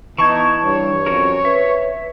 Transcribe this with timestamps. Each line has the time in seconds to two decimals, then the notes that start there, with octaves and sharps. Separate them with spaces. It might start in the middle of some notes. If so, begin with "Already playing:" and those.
0.18 E3 B3 D#4 A5 C#6 G#6
0.64 G2 C#5
1.06 F2 C#4 F#4 A#4
1.45 B4 E5